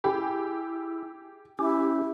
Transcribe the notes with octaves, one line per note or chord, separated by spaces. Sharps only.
E4 G4 G#4
C#4 E4 G4